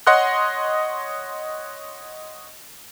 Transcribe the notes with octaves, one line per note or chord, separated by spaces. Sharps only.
C#5 D#5 F#5 C6 D#6 F#6